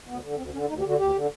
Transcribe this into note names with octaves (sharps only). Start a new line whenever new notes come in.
D2 B3
D3
D2 C4
D3 C#4
D2 D#4
G4
D3
F#4
D2 G4
D3